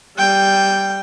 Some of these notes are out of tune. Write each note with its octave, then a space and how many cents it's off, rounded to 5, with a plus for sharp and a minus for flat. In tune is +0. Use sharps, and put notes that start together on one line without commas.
G3 -10 G5 +0